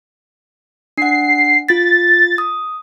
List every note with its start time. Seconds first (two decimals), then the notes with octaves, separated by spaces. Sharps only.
0.98 D4 F#5 C7
1.69 F4 A6 B6
2.38 D#6